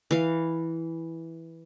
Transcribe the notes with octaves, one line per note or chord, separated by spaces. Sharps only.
E3 F5